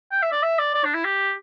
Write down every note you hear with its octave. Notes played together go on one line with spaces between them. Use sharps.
G5
E5
D5
E5
D5
D5
D4
E4
G4